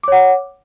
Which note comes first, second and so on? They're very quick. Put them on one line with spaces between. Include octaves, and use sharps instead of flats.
D6 C#5 F#5